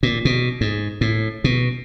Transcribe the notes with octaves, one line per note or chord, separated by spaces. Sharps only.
A#2
B2
G#2
A2
B2